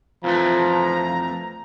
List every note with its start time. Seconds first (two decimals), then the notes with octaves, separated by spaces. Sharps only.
0.24 F2 E3 F3 A3 A#5